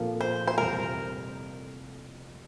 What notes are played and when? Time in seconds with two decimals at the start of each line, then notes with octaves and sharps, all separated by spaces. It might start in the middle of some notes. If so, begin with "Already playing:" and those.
Already playing: A#2 F3 A#3 F4 A4
0.21 C5
0.47 C5
0.58 F1 F2 E3 G3 C4 A#4